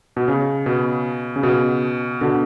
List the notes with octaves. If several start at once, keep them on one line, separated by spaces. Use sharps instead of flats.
B2
C#3
B2
C#3
B2
B2 D3